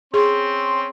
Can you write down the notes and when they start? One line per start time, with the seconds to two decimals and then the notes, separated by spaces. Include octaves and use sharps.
0.14 C4 C#4 G#4 C6